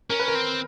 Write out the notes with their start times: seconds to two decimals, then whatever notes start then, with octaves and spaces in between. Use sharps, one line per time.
0.10 C#4 A#4
0.20 B4
0.28 A#4
0.35 C4